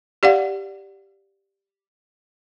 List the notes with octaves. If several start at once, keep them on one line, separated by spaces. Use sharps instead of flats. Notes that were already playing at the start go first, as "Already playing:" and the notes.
G4 D5 F5 F#5